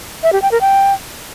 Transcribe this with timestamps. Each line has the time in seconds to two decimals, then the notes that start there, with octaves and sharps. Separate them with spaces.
0.23 E5
0.33 G4
0.42 G5
0.51 A#4
0.61 G5